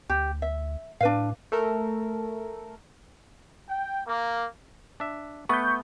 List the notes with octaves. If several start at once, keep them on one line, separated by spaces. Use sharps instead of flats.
D2 G4
E5
A2 D4 B4 F5
A3 A4 A#4
G5
A#3
D4 E5
A3 B3 B4 C#6 G6